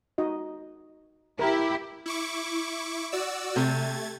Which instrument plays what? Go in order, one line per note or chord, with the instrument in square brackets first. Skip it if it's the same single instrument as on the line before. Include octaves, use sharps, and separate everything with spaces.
[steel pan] D#4 F#4 D#5
[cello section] E4 G4 [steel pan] A#4
[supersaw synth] E4 C#6 D6
F#4 D5 E6
[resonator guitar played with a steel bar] C3 [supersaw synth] A3 G#6 A6